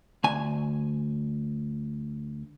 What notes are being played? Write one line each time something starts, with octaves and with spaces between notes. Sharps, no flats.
D2 G#5